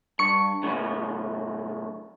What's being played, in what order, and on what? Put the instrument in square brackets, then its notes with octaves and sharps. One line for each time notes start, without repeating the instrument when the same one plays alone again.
[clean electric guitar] G2 [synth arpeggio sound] C#6 C#7
[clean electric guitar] F#2 A2 C#3